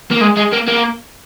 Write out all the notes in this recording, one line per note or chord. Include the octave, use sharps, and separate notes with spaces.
A#3
G#3
G#3
A#3
A#3